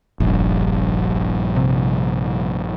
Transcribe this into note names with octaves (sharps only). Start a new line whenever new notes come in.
F1 A#1 G2
C3